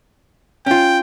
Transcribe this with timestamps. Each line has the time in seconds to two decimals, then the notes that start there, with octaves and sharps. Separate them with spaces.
0.66 C#4 F4 G5